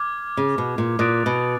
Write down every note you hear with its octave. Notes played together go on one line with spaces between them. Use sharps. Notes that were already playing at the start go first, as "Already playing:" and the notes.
Already playing: D6 F6 G#6
C#3
B2
A#2
A#2 D#6 F#6 A6 D7
B2